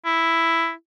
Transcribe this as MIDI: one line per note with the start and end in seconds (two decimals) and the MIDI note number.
0.05 0.72 64